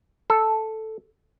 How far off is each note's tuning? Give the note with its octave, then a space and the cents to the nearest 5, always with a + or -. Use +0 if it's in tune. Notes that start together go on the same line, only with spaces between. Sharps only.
A4 +0